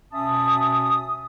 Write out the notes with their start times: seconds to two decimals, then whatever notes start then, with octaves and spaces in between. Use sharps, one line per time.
0.12 B2 C#4 E5 A5 D#6